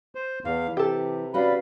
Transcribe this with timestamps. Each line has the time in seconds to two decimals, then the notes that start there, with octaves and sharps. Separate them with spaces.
0.15 C5
0.45 E2 E3 F5
0.77 C3 G4 A4
1.34 C#4 F#4 B4 D5 F5 B5